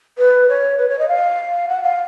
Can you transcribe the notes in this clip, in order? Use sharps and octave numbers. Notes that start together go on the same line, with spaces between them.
B4
C#5
B4
C#5
D#5
F5
F#5
F5